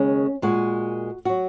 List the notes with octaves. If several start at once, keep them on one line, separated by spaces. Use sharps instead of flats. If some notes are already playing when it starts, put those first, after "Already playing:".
Already playing: D#2 C#3 G#3 C#4
A#2 G#3 F#4
F#3 F#4